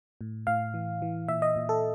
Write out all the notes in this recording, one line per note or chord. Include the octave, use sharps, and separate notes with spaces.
A2
A2 F5
E3
E3
A#2 E5
D#5
A#2
A4